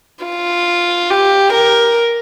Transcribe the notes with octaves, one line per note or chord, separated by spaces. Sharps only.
F4
G4
A#4